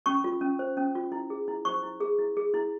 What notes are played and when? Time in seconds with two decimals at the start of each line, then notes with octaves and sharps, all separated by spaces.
0.06 C#4 C#6
0.24 F4
0.41 C#4
0.59 C5
0.77 C#4
0.95 F4
1.12 E4
1.30 G#4
1.48 E4
1.65 C5 C#6
1.83 E4
2.01 G#4
2.19 E4
2.37 G#4
2.54 E4